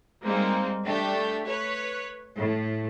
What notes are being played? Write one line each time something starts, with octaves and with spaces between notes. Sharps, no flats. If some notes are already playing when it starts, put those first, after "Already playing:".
G3 G#3 A#3 C4 D#4
A3 D4 G4
B4 C#5
A2